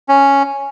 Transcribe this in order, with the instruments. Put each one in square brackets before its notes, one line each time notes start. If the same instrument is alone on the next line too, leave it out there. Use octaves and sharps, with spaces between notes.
[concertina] C#4